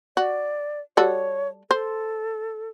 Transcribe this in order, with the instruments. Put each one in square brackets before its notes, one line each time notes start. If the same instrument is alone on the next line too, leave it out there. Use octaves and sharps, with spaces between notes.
[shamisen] F#4 [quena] D5
[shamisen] G3 F#4 A4 [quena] C#5
[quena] A4 [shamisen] C5